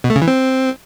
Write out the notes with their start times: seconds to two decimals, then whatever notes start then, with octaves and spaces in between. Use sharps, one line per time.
0.04 B2
0.10 A3
0.16 C#3
0.22 E3
0.27 C4